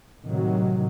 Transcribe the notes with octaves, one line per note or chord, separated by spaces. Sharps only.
A2 C3 D#3 F#3